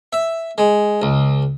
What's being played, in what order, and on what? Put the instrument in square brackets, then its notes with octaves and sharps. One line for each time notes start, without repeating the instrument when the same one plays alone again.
[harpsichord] E5
G#3
C#2